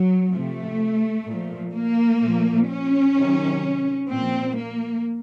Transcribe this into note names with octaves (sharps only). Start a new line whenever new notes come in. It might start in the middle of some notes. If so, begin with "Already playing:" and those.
Already playing: F#3
C3 F3 A3
A#2 F3
A#3
A#2 F3
C#4
C3 D#3 F#3
A#2 F3 C4
A#3